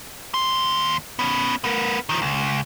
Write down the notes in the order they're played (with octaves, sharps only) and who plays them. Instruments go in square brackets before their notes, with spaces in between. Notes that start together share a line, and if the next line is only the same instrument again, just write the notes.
[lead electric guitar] D#2 C6
B3 C#4
B3 A#4
D#3 F3
C#2